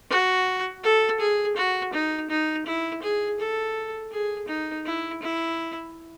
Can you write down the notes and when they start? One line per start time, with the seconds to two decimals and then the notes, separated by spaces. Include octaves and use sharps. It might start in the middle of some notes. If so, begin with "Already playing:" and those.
0.10 F#4
0.84 A4
1.20 G#4
1.57 F#4
1.93 D#4
2.30 D#4
2.66 E4
3.02 G#4
3.39 A4
4.12 G#4
4.48 D#4
4.86 E4
5.22 E4